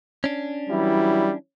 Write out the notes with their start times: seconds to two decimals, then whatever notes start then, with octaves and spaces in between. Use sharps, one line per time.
0.24 C#4 D4
0.69 E3 F#3 G3 E4